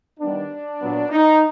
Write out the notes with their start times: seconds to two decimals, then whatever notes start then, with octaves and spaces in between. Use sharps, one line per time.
0.19 D#3 G3 B3 D4
0.80 A#2 F#3 B3
1.09 D#4